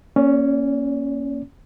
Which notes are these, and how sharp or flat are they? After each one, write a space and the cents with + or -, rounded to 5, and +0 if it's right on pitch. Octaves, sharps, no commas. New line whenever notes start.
A#3 +15 C#4 +0 D5 -40